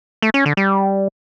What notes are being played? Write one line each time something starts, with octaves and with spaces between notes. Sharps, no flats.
A3
C#4
D3
G3